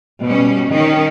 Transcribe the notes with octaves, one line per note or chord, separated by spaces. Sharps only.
B2 G3 C#4
D#3 C#4